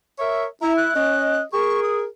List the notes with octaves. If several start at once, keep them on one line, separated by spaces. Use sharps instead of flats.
A#4 C#5 E5
E4 A#5
F#6
C#4 D#5
G#4 A#4 C#6
D#6